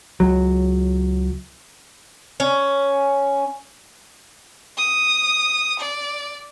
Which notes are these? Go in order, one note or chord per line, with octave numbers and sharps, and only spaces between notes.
C#2 F#3
C#4
D#6
D5